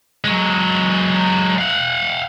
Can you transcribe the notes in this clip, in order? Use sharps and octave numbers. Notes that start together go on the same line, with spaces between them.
F#3 G#3
F5 F#5